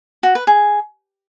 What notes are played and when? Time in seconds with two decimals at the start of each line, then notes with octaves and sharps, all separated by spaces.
0.23 F#4
0.35 B4
0.47 G#4